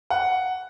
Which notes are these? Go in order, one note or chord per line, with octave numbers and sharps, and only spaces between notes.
F#5